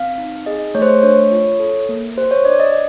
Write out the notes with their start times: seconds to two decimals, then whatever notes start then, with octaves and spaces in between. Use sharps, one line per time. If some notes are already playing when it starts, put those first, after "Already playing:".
Already playing: C4 F5
0.18 D#4
0.46 G#4 D#5
0.75 A3 C#5
0.82 C5
0.90 C#5
1.03 D4 C#5
1.31 F4
1.60 A4
1.89 A#3
2.17 G4 C5
2.31 C#5
2.45 D4 D5
2.60 D#5